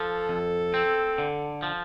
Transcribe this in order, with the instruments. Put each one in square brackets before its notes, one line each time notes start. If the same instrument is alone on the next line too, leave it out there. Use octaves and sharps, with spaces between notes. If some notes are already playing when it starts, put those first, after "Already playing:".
Already playing: [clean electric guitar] F3 [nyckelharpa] A4
[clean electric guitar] F2
C4
D3
F3